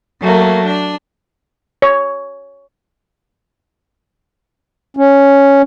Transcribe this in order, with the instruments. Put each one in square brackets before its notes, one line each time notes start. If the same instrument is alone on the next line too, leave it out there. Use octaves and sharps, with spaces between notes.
[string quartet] F#3 A3 A#3
D4
[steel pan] C#5
[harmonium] C#4